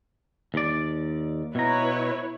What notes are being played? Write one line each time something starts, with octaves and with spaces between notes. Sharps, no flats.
D#2 D5
B2 E4 B4 C#5 A#5